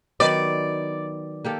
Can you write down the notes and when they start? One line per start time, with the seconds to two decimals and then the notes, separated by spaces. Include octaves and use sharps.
0.20 D#3 F#3 B3 D5
1.45 A#3 G4 A4